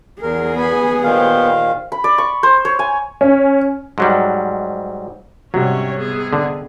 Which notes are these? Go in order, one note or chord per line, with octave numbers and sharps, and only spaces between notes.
E2 G#4 A#4
B3 G#5 B5
A#2 D#3 G4 C5 F5
B5
D5
C#6
C5
C#5
G#5
C#4
G#2 F#3 G3
G#2 C3 F#3 G3 C#4 C#5
B3 G#4
D3